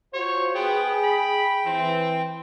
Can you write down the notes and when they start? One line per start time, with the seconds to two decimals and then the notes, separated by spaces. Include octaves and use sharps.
0.14 F4 F#4 C5 C#5
0.55 B3 G#4 G5
1.04 B5
1.66 E3 C4